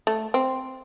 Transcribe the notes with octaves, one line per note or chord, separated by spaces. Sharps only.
A3
C4